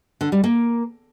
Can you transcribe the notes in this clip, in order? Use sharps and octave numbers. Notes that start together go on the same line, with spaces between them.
D3
G3
A#3